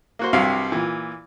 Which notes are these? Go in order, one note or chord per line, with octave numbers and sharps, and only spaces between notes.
A#3 F#4 C5
C2 G2 C3 F#3 F5
A#2 E3